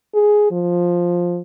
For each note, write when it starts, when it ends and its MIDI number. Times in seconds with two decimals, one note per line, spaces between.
0.14 0.49 68
0.51 1.41 53